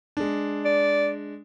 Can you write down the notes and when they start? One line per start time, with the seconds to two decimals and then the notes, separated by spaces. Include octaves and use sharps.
0.17 G#3 D4
0.65 D5